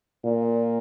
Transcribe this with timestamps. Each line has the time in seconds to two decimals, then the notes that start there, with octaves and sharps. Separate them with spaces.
0.24 A#2